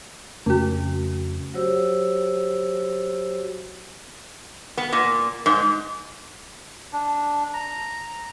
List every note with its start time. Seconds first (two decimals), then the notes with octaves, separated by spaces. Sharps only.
0.46 F2 C#3 A3 C#4 F#4
1.54 F#3 F#4 G4 C5 C#5 E6
4.77 B3
4.93 A#2
5.46 G#2
6.92 D4
7.53 A#5